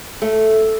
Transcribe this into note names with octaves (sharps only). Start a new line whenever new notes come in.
A3